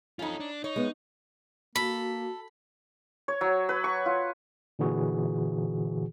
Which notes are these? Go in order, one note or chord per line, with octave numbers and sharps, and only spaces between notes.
C#4 D#4 F4 A4
D4
D#4 C#5
G#3 B3
A#3 F#4 A4 B5
C#5
F#3
B4
C#6
F4
A#2 D3 E3 F#4 G#4